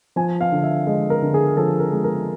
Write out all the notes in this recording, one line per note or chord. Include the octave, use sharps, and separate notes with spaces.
F3 G#5
F5
D3
E5
G#3 D#5
A#4
D3
G#4
F3 A4
A#4
G#3
A#4